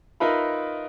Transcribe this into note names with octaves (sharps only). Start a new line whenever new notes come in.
D#4 F4 A#4 B4 E5 B5